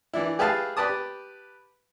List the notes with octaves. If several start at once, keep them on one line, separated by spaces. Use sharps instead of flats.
E3 D4 E4
G4 G#4 B4 E5 F5 A5
G4 B4 D5 A5 D#6